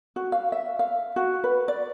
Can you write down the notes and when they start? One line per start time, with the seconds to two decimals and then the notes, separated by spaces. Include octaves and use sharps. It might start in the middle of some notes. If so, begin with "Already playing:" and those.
0.16 F#4
0.32 F5
0.52 E5
0.79 F5
1.16 F#4
1.44 B4
1.68 D5